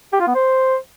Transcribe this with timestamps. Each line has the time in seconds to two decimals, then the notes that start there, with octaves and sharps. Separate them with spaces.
0.13 G4
0.20 F4
0.27 B3
0.35 C5